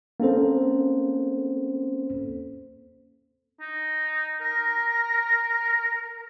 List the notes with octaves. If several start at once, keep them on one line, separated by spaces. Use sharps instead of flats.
A#3 C4 C#4 A4 C5
D#4
A#4 A#6